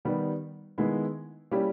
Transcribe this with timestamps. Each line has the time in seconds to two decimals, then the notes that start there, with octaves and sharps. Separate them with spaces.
0.05 D#3 G3 B3 G4
0.78 D#3 G#3 B3 E4
1.51 G3 A#3 C#4 E4 G4